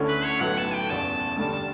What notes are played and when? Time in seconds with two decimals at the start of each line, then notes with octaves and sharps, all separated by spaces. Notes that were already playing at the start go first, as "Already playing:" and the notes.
Already playing: D2 D3 A3 C#4 E4
0.08 B4
0.24 C#5
0.41 B1 A2 F#3 B3 E4 F#5
0.58 A5
0.74 G5
0.89 F#1 E2 B2 A5
1.37 G2 D3 G3 A5